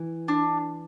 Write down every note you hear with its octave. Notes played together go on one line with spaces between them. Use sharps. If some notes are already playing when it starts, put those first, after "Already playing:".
Already playing: E3
D4